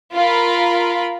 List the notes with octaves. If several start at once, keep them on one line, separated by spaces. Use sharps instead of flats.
F4 A#4 B5